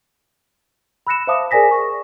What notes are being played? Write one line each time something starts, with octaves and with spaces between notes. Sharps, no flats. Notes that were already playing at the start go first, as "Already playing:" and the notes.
B5 E6 F#6 A#6 C#7 E7
C5 E5 F5 A5 D6 D#6
G#4 A#4 D5 G#5 A#6 B6
C#6